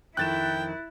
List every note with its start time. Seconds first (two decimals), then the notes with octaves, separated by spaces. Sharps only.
0.17 F2 D#3 F3 E4 G5 F#6 A6 E7